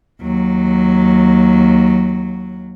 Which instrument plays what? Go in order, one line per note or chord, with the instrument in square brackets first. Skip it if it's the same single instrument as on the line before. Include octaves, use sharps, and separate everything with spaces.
[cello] D#2 F#3